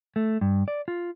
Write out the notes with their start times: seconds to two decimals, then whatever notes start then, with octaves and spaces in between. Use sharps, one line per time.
0.16 A3
0.41 G2
0.68 D5
0.88 F4